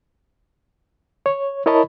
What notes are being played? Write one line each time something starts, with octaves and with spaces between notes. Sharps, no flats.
C#5
E4 A#4 C#5 D#5 A5 B5